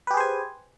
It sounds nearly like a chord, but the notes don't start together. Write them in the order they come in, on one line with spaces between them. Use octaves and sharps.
B4 G4 G#4 C5 G#5